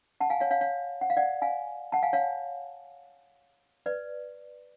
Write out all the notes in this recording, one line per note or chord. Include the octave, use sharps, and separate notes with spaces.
F#5 A5
F5 G#5
C#5 F5
C#5 F5
C#5 F5
F#5
F5
D5 F#5
F5 G#5
F#5 A5
F5 G#5
C#5 F5
B4 D5